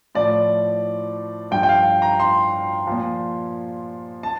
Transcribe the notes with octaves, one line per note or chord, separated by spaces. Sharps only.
A2 F3 D5
G2 F3 G5
G5
F5
A#5
C6
A#2 F3
A5